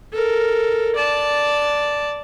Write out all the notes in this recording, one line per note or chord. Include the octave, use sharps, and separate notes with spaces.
A4 A#4
D5 A5